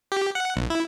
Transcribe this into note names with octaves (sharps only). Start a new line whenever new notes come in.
G4
F#5
B1
E4